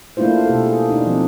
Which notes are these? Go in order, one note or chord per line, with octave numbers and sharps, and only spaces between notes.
A3 A#3 D4 E4 F4 C5
F4
B2 G4 A4
G#4
D4 D#4
F3 C4